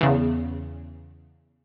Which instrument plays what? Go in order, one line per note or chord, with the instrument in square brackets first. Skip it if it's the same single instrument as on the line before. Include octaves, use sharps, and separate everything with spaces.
[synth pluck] E2 C#3